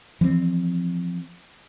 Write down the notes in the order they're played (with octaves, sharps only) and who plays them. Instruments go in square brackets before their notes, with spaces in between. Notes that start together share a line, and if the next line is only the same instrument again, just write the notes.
[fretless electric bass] E3 F3 A#3 C4